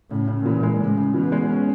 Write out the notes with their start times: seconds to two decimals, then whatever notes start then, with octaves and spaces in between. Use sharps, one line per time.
0.10 A2 C#3
0.28 C#3
0.45 A#2 E3
0.63 G#3
0.79 A2 C#3
0.97 C#3
1.14 B2 E3
1.32 G#3
1.50 C#4